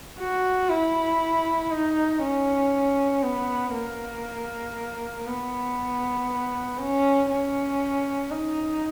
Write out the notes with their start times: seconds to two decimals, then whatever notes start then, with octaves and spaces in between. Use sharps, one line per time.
0.19 F#4
0.70 E4
1.71 D#4
2.22 C#4
3.23 B3
3.74 A#3
5.27 B3
6.79 C#4
7.30 C#4
8.31 D#4